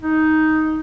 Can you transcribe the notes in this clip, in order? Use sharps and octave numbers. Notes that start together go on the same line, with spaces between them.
D#4